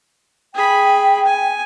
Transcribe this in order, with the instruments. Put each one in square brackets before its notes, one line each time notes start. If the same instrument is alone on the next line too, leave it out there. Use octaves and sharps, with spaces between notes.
[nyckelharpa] G#4 B5 [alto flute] G5
[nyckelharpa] G#5